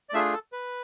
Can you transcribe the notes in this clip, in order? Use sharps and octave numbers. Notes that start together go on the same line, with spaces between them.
D5
A3 D4 F4 G#4 E5
A4
B4